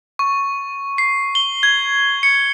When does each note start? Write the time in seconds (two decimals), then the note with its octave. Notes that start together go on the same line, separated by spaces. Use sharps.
0.19 C#6
0.98 C7
1.35 G7
1.63 G#6
2.23 C#7